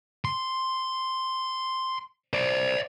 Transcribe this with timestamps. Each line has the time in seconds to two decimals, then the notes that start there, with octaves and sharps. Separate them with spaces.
0.25 C6
2.33 C5 D5